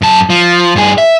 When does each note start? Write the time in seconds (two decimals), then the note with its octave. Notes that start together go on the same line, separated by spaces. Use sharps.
0.02 F#2 A5
0.30 F3
0.76 G2 G#4
0.98 E5